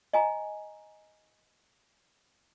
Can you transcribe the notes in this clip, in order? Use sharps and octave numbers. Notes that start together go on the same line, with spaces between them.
D#5 G#5 A#5